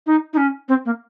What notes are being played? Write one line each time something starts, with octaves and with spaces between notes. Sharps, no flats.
D#4
D#4
C#4
C4
A#3